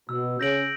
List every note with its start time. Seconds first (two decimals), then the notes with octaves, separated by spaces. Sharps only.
0.09 B2 E6
0.39 C#3 G6 A#6 D7 F#7